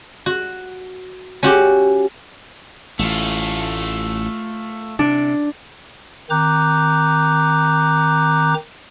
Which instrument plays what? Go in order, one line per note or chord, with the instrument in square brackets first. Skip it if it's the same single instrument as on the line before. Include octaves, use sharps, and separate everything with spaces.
[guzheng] F#4
C#4 F#4 G4
[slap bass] A1 [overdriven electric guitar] A3 F4
[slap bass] C3 [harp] D4
[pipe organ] D#3 C4 A#5 D6 F#6 G6